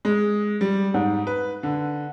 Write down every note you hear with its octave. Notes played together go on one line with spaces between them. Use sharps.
G#3
G3
G#2
B4
D3